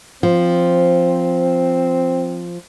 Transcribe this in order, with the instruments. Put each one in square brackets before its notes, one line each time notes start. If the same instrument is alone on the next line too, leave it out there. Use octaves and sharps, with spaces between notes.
[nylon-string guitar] F3 [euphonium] C4